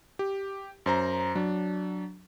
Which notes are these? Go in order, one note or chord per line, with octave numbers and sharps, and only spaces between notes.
G4
F#2 C5 A#5
F#3 D4